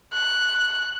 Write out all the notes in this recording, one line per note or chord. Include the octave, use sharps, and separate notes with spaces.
F#6